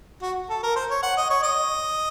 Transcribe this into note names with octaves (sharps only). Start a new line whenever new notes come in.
F#4
A4
A#4
C5
C#5
F#5
D#5
C#5
D#5